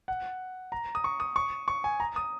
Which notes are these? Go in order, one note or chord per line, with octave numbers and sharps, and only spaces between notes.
F#5
A#5
D#6
C#6
D#6
C#6
C#6
G#5
A#5
D#6